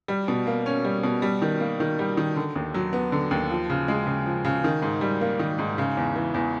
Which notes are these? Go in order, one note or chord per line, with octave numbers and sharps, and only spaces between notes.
G3
B2
A#3
C#4
G3
B2
G3
D#3
A#3
D#3
G3
D#3
D3
D#2
F#3
B3
D3
D#2
F3
C#3
G#3
C#3
F3
C#3
D#3
G#2
G3
A#3
D#3
G#2
C#3
E2
E3
E2